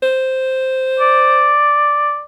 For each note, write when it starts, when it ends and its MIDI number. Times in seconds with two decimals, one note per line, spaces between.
0.03 1.55 72
1.00 2.22 74